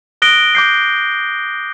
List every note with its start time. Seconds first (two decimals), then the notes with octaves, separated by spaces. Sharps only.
0.22 D#6 F#6 A#6 D7 G7
0.55 D6 G6 C7